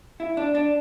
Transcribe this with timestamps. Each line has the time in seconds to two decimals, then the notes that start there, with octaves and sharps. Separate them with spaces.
0.20 E4
0.37 D4
0.55 D4